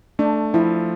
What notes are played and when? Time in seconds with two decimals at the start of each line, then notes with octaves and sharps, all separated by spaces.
0.19 A3 D4
0.54 F3 E4